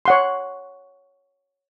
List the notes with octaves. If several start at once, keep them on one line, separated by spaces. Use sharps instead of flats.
C#5 F#5 C6